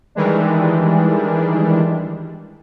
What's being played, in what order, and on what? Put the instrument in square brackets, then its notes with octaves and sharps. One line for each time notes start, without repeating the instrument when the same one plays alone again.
[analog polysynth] D#3 E3 G3 G#3 D4